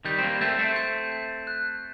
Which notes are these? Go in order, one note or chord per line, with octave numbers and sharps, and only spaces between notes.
D#3 G3 G6
C4
G3 A#3
A3 C4 G6
A3 C4
G6
G6
F#6